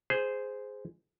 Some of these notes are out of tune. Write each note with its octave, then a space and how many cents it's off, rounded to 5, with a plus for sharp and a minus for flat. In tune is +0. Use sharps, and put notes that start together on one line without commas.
G#4 +0 C5 -10